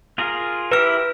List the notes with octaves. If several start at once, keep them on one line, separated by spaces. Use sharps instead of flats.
F4 G#4 A#4
E4 G4 A#4 B4 F6